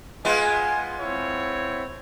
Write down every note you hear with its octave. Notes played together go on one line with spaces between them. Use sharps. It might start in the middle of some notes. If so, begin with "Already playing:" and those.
G#3 B3 F4 G#5
C4 E4 C#5